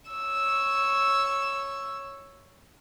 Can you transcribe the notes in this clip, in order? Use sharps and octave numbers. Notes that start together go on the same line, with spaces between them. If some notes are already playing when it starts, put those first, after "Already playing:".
C#5 E6